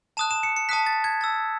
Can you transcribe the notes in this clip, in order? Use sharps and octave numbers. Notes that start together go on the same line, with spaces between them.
A5 D#6 F#6 E7
E7
C#7
C#7
A5 D#6 F#6 B6
A6
G#6
A5 E6 A6